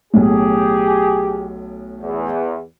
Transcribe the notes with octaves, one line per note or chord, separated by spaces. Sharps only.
B1 A2 G4 G#4
E2